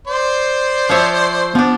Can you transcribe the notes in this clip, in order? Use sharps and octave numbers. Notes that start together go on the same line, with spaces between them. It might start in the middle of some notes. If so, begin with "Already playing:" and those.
C5 D5 C6
F3 C#5 E5
F3 B3 D4